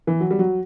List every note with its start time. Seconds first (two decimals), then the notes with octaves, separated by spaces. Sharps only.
0.07 E3
0.20 F#3
0.31 G3
0.39 F#3